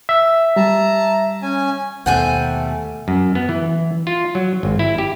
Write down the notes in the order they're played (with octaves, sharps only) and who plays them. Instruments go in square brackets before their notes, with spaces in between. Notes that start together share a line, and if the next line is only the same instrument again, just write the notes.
[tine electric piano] E5
[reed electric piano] G3 [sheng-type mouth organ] A5 A#5
[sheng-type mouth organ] C#4 G#5
[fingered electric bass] D#2 B2 [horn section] G3 A3 [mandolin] C5 G#5 G6 [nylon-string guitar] F#5
[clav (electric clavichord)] F#2
B3
E3
F4
F#3
G#1
E4
G4